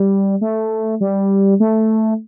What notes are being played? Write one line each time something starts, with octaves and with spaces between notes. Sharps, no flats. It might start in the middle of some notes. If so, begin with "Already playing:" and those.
Already playing: G3
A3
G3
A3